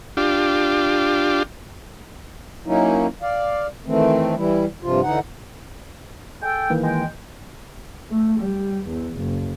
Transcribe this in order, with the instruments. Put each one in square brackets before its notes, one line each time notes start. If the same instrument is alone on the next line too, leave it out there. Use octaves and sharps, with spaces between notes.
[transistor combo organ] D4 F4 G4
[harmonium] F#3 A#3 C#4 D#4 E4
D5 F5
D#3 E3 A3 C4
E3 G3 E4
G2 C3 F3 F4
D3 E3 D#4 F#5
[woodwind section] G#4 A4 G5
[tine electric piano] D#3 E3 A#3
[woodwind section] G#3 G5
[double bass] A3
G3
E2
F#1